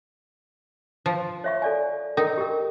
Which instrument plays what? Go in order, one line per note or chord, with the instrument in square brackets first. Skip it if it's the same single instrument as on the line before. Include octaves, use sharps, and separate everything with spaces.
[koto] F3
[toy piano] C#5 E5 C#6
A4 D5 G#5
[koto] D#4 [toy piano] A4 A#4 G5
[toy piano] G4 A#4